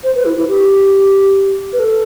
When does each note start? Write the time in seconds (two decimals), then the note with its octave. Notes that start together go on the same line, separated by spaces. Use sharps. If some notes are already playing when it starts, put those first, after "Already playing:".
0.04 C5
0.15 B4
0.25 E4
0.37 E4
0.48 G4
1.73 B4
1.79 A4